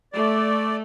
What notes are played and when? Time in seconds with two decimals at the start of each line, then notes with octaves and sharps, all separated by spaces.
0.13 A3 D5